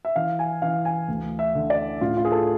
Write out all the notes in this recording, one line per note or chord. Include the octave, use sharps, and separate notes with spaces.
E5
E3 F5
G#5
E3 F5
G#5
D2
E5
D3
D5
A2 F4
F4
G#4
A4